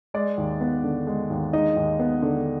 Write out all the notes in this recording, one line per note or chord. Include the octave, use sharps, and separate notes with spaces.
G#3 D5
D#2
B3
D3
G#3
D#2
G#3 D#4 D#5
D#2
B3
D3